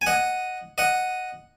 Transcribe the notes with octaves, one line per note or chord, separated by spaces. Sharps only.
G#5
D#5 F#5
D#5 F#5